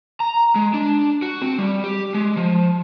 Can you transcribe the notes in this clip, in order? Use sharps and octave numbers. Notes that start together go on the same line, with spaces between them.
A#5
G#3
D4
F#4
C4
G3
G4
G#3
F3